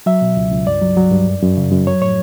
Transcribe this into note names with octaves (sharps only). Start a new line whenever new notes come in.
F#3 E5
B2
C#2
C#2
G2 D5
F#3
F#3
G2
F#2
F#2
C#3
F#2
F#3 C#5
A2 C#5